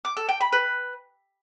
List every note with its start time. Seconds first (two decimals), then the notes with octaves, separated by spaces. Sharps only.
0.05 D6
0.17 A4
0.29 G5
0.41 B5
0.53 B4